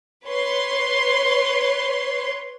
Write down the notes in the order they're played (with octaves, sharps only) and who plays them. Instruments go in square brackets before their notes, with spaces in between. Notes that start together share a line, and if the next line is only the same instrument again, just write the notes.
[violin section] B4 C#5 C6